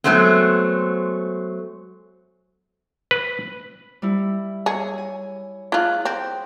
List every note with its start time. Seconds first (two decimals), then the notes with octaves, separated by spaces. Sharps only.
0.04 F#3 G#3 A3 B3 C4
3.11 B4
4.02 G3 E4
4.66 G#4 C#5
4.98 G#5
5.72 E4 F4 G#4 F#6
6.05 C4